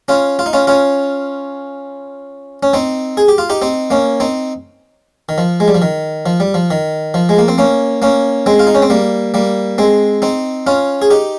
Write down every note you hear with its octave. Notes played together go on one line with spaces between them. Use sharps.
C#4 F4
F4
D#4
C#4 F4
C#4 F4
C#4
C4 D#4
G#4
G4
F4
D#4 G4
C4 D#4
A#3 C#4
C4 D#4
D#3
F3
G#3
G3
F3
D#3
F3
G3
F3
D#3
F3
G#3
A#3
C4
A#3 C#4
A#3 C#4
G#3 C4
F4
D#4
C#4
C4
G3 A#3
G3 A#3
G#3 C4
C4 D#4
C#4 F4
G#4
D#4 G4